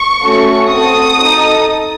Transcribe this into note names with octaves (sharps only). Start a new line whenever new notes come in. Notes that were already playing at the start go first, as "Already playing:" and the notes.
Already playing: C#6
A3 C#4 F#4 A4
C4 F#4 A4 D#6
D#4 A4